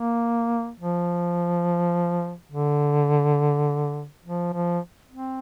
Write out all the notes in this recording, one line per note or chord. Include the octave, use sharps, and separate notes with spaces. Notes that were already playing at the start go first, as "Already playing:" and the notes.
Already playing: A#3
F3
D3
F3
F3
C4